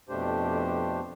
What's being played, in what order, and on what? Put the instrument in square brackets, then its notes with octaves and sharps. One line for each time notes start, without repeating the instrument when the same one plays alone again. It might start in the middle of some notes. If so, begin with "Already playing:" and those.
[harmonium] F2 B2 A3 D4 G4 C5